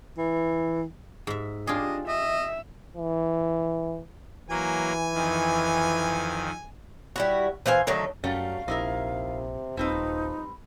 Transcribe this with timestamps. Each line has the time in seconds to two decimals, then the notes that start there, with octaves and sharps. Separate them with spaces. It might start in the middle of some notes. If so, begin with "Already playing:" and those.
0.18 E3
1.27 G#2 E5
1.67 D4 F4 G4 G#4 D#5
2.08 D#5 E5
2.97 E3
4.50 E3 F#3 A#3 G#5
5.14 F2 D#3
7.16 G3 E4 F#4
7.66 E3 C5 F5 G#5
7.87 D3 D#3 F#3 A3
8.24 F#2 F#3 G3 A3 C#4 F5
8.68 A#1 C3 D#4 E4 A#4
9.77 D#1 F3 G3 C4 D#4 B4